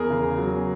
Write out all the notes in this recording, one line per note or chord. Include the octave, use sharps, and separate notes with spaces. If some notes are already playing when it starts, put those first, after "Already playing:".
Already playing: E2 G#4 A#4
C#3
F#3